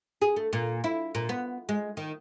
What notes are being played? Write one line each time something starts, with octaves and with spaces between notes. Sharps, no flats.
G#4
A3
A#2
E4
A#2
B3
G#3
D#3